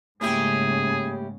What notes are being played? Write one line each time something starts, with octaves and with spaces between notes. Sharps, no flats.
G#2 C#3 A3 A#3 C#4 E4 G4 G#4